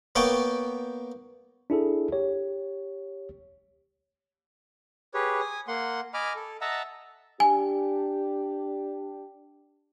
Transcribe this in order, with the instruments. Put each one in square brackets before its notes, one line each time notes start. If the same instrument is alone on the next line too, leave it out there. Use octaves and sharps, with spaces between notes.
[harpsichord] A#3 B3 C#5 G5
[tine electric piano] D4 E4 G#4 A4
G4 C#5
[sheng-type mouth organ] G4 G#4 B4 C#5
G#5 D#6
A#3 F#5 C6
D#5 G#5 B5 D6 F6
A4
D#5 E5 F#5 A5 A#5 E6
[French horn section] D4 G4 [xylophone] G#5